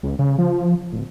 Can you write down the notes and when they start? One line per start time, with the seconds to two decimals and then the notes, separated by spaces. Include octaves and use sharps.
0.03 C#2
0.19 C#3
0.38 F3
0.92 D1